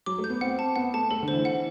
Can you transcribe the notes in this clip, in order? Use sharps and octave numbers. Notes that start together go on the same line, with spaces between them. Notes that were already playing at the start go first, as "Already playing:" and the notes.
F#3 D6
A3
G6
B3
C4 F#5
A5
B3 F#5
A3 A5
A3 A4
D3
C5
E3
F#5